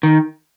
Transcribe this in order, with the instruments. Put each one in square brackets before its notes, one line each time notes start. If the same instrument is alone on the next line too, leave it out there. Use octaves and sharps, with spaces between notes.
[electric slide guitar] D#3